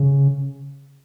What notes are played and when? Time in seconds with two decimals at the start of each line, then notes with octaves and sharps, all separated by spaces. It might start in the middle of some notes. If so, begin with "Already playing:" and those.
Already playing: C#3